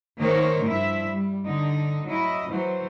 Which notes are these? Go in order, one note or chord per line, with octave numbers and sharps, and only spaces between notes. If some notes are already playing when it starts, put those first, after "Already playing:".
D#3 A#3 D#4 A#4 C5 C#5
G2 F3 E4 E5
G3
D3 D#4
F#3 E4 D#5
E3 F#3 C5